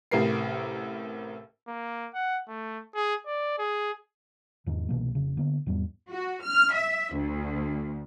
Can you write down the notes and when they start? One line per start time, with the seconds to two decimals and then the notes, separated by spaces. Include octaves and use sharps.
0.11 A1 A2 C3 A#4 C7
1.68 A#3
2.14 F#5
2.48 A3
2.95 G#4
3.26 D5
3.58 G#4
4.67 E2 G#2 D#3
4.89 C2 B2 E3 A#3
5.15 F1 C#3
5.37 D3 A#3 B3
5.66 E2 G#2 G3 B3
6.09 F#4
6.43 F6
6.74 E5
7.15 D2